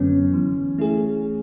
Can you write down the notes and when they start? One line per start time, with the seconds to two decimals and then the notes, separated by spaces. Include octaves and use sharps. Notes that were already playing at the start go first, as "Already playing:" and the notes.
Already playing: F#2 D3 F#3 B3 C#4
0.33 E3
0.78 A3 E4 G#4